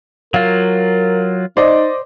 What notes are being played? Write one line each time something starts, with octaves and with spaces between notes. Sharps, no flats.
F#3 F4 A#4 F5
D#4 C5 D5 D#5